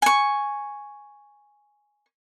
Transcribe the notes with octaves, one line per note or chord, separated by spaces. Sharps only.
G#5 C#6